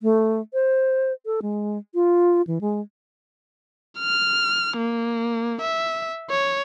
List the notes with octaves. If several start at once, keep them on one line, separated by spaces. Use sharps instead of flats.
A3
C5
A4
G#3
F4
E3
G#3
F6
A#3
E5
C#5